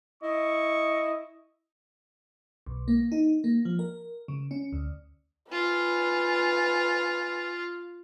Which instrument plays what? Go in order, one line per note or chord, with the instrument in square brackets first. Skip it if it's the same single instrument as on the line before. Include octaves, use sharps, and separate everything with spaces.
[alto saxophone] E4 [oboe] D#5 [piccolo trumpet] C#6
[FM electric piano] B1
A#3
D#4
A#3
F3
A#4
C#3
C#4
D2
[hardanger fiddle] F4 [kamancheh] B4 G#5